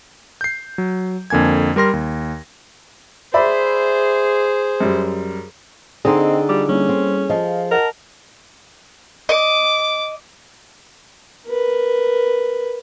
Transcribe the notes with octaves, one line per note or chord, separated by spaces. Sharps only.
G6 C7
F#3
F2 D3 A#3 G#5 G#6
G3 A#4 C6 A#6
D#2
G#4 C5 D5 E5 B5
F#2 G3
D3 C4 D#4 G#4 D#5 G5 C6
G3 F4 D6
G3 A#3 C#4 E4
C4
F3 D#5 F5
A#4 D#5 F#5 A5
D#5 D6
A#4 B4